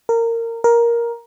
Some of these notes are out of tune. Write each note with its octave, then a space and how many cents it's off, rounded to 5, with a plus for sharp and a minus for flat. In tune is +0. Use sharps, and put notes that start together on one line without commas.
A#4 -20
A#4 +10